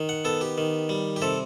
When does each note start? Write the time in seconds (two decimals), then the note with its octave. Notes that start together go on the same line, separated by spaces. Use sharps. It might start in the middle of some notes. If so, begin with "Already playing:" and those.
Already playing: D#3
0.09 F#5
0.25 B3 A4
0.41 G4
0.58 D#3
0.89 G3
1.16 G4
1.22 C3 A4